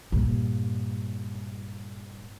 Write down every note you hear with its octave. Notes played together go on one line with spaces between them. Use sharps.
G2 A#2